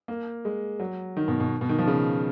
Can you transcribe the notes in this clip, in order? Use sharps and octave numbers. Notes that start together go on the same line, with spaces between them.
A#3
G#3
F#3
D#3
B2
B2
B2
D#3
F3
C#3